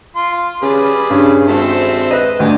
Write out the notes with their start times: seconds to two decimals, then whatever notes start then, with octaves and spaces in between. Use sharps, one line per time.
0.16 F4 C6
0.62 C#3 G3 G#4 B4
1.10 G2 C#3
1.48 G#1 C4 A4 E5
2.11 B4 D#5
2.40 D2 G2 D4 G4 G#5